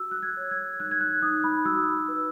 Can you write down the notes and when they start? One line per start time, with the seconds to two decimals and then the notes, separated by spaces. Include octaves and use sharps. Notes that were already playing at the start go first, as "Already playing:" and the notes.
Already playing: F#4 E6
0.11 F#6
0.23 G#6
0.37 C#5
0.51 G#6
0.79 D#4 F#6
0.91 G#6
1.01 F#6
1.22 D#4 D#6
1.44 B5
1.65 F#4 E6
2.08 B4